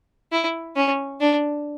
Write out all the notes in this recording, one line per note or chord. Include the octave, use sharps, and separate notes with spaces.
E4
C#4
D4